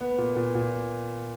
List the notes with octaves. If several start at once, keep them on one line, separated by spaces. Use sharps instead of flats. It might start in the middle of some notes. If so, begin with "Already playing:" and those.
B3
A#2
A#2
A#2